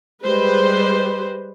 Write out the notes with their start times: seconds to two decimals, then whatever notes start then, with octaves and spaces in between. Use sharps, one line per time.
0.24 G3 G#3 B4 C5